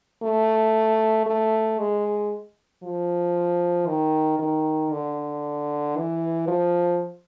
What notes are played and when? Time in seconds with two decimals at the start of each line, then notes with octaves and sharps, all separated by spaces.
0.23 A3
1.26 A3
1.79 G#3
2.83 F3
3.87 D#3
4.39 D#3
4.92 D3
5.97 E3
6.48 F3